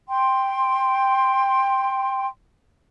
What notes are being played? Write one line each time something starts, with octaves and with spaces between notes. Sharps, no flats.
G5 C6